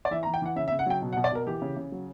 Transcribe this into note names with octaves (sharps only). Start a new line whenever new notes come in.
D5
E3 E5
A#5
E3
G5
E3 F#5
C#3 E5
E5
C#3
F#5
F#3 G5
B2
F#5
B2
D5
B2 A#4
E3 G4
C#3
C#3
F#3